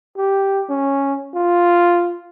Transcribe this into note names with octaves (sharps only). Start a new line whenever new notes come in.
G4
C#4
F4